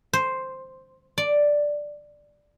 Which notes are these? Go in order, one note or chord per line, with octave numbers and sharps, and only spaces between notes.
C5
D5